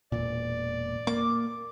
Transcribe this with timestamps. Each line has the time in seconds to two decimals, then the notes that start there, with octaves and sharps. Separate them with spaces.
0.12 E1 A#2 D5
1.07 A#3 D6